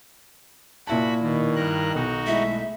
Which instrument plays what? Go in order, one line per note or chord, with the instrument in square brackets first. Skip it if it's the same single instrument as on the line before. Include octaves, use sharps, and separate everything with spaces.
[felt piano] A#2 E5 A5 [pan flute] E4 [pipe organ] F#4 B5
[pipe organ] B2 [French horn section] D#3
[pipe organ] G2 A#4 F#6
[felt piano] B1 [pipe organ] D#4 F#4
[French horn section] G#3 A3 E4 [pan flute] E5